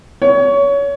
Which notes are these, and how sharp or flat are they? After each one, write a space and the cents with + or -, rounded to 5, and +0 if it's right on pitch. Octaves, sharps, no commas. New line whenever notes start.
C#5 +25